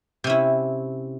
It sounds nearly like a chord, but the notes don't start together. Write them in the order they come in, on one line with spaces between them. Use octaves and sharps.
C3 C#4 E4